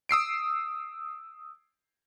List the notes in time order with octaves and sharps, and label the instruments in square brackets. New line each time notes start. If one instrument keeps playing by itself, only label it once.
[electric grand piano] D#6 E6 C7 D7